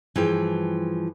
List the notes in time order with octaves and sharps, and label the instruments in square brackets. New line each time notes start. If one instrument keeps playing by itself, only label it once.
[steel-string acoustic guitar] G2 G#4 G5 [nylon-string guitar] E3 F3